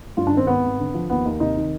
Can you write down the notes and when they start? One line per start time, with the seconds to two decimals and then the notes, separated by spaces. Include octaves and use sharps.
0.17 G2 F4
0.27 D4
0.32 D#3
0.37 C4
0.47 G#1 B3
0.64 G#1
0.79 D3
0.94 F3
1.10 D#2 B3
1.25 D#2
1.40 C3 D#4
1.56 D#3